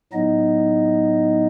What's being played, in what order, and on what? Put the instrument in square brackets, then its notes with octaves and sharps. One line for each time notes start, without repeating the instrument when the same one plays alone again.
[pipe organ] A2 F#3 B3 D#4 D#5